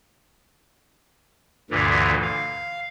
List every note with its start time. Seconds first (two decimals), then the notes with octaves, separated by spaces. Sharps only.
1.71 D2 G2 A#2 D3 E3
2.22 F5